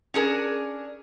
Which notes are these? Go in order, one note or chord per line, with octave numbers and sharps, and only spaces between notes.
C#4 D4 G#4 A#4